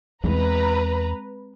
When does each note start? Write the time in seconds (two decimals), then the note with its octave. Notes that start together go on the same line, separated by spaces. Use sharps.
0.24 E2 G#3 C4 B4 A#5